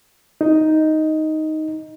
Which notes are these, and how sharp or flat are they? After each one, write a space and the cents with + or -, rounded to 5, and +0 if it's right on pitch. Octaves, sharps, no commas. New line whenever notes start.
D#4 +5